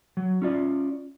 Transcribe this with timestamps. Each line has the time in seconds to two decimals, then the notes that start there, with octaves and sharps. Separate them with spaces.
0.17 F#3
0.42 C#4 F4 D5